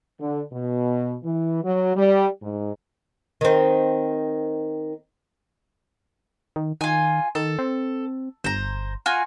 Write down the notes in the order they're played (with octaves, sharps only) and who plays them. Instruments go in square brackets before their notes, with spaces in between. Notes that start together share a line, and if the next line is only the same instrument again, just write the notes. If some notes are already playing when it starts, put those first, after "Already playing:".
[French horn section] D3
B2
E3
F#3
G3
G#2
[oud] D#3 C4
[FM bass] D#3
[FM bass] D#3 [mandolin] F4 G#5
[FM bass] D#3 [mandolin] A4
[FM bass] C4
[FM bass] G1 [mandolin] C5 A#5
[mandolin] F4 F#4 G#5